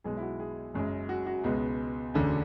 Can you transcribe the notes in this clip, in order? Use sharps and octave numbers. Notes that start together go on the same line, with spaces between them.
B1 B2 G#3 G#4
E4
F#4
G#4
F#1 F#2 C#3 G#3
F#4
F#4
C#2 B2 G#3 B3
E1 D2 D3 C#4